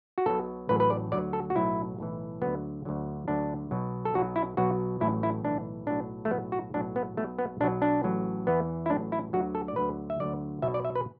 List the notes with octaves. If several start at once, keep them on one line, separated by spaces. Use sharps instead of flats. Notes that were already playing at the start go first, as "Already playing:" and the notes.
F#4
B1 B2 F#3 A4
A1 A2 F#3 B4
B4
D5
D2 D3 F#3 D5
A4
F#4
B1 A2 F#3 E4
B1 A2 E3
D2 D3 F#3 B3
D2 D3 F#3
D2 D3 F#3 D4
B1 B2 F#3
A4
B1 B2 F#3 F#4
E4
B1 B2 F#3 F#4
A1 A2 F#3 E4
E4
B1 A2 E3 D4
B1 A2 F#3 D4
A3
B1 A2 F#3 B3
F#4
B1 A2 F#3 D4
B3
B1 B2 F#3 A3
B3
B1 B2 F#3 D4
D4
A1 A2 F#3
E2 E3 B3
E4
A1 A2 F#3 D4
E4
D2 D3 F#3 F#4
A4
D5
D2 D3 F#3 B4
E5
D2 D3 F#3 D5
B1 B2 F#3 E5
D5
E5
B4